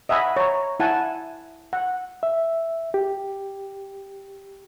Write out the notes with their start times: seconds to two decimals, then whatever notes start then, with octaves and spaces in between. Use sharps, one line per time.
0.09 D#5 E5 F#5 G#5 B5
0.37 C#5 A#5
0.80 E4 F#5 G#5 A5
1.73 F#5
2.23 E5
2.94 G4